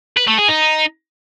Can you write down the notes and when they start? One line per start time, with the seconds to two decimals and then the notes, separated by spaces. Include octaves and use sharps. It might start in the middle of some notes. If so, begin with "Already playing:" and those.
0.17 B4
0.28 A3
0.38 G#4
0.49 D#4